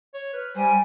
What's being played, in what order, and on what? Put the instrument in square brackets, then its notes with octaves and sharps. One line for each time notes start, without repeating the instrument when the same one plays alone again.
[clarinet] C#5
[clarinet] B4 [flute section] F6
[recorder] G3 [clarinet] C5 [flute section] G5 G#5